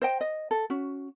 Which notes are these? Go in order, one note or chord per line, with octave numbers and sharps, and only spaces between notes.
C5 D#5 G5
D#5
A4
C#4 F#4